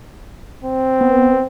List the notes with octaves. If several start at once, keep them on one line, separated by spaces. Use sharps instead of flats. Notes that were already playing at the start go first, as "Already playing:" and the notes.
C4
B3